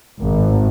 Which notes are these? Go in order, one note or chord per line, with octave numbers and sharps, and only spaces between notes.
G#1